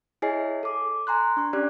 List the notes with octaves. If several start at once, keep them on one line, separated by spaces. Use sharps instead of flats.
E4 G#4 C#5 D#5 G#5 C7
A4 D6
G#5 A#5 C6 F#6
D4 C#6
C#4 D4 G4 D5 F#6